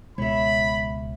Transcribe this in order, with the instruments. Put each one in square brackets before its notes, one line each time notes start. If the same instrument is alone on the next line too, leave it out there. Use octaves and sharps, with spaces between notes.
[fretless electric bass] C#2 B2 G#3 [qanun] C#5 E5 [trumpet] B5